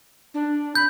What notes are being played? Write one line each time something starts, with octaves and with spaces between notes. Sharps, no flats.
D4
B5 G6